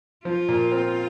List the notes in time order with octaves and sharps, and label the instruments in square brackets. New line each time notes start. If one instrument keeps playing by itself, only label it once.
[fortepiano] F3 [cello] F4
[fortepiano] A#2
C4